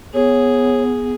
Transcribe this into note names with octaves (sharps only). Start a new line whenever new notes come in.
B3 G#4 C#5